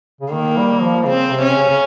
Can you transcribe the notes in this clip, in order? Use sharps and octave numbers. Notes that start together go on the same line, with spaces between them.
C#3
D#3 A#3
G3
F3
C#3 C4
C3
C#4
C#3
C#3